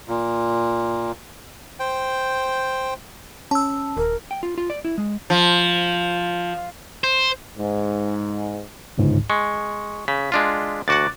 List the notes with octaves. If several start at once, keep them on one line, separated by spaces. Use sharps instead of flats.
A#2
C5 G5
C#4 A5 E6
D#1 A#4
G5
F4
F4
D5
E4
G#3
F3
C5
G#2
G1 C#2 G#2
G#3 C#6
C#3 B6
G#3 D4 F4
D2 F#4 F#5 D6 F#6 A6